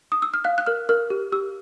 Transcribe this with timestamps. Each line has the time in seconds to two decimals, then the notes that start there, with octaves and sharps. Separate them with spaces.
0.12 D#6
0.22 E6
0.34 F6
0.44 F5 F#6
0.58 F#6
0.66 A#4 F6
0.89 A#4 F6
1.10 G4
1.32 G4 E6